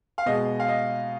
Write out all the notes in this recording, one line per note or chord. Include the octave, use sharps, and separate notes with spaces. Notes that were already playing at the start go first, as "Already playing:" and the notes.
F5
B2 G#3 D#5
F5
D#5